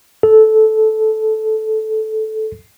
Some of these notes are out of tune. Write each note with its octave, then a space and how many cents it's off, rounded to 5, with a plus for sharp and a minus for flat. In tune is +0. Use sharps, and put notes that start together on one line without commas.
A4 -10